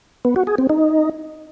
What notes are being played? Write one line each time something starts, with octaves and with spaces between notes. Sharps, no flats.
B3
F#4
G#4
C4
D#4